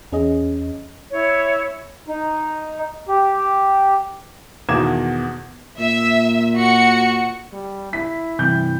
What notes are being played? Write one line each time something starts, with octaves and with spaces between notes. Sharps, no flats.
E2 C#4 G#4 D#5
E4 C#5
D#4
G4
E2 B2 D#3 D6 G#6 E7
A#2 E5
F#4 C#7
G3
E4 B6
G2 C3 E3 G6